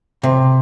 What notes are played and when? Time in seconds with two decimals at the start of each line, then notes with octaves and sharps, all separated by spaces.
0.23 C3